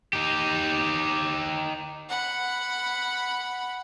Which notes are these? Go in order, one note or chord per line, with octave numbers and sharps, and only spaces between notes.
D#4 G4
F#5 B5